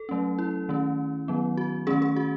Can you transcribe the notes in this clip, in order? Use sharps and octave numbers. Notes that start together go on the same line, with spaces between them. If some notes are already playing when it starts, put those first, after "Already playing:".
Already playing: A4
F#3 A3 C#4
E4
D#3 A3 C#4
D#3 F#3 B3
F#4
D#3 A3 C#4 G#4
G#4
F#4